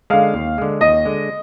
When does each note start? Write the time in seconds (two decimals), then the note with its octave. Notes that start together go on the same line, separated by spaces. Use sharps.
0.10 D3 G#3 F5
0.34 D#2
0.58 D3 G#3
0.81 D#2 D#5
1.05 D3 G#3